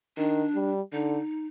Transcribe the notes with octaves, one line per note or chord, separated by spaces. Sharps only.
D#3 D4
G3
D3 D#4